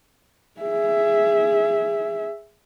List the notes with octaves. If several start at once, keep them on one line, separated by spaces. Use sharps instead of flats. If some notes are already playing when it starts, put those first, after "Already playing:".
G#4 E5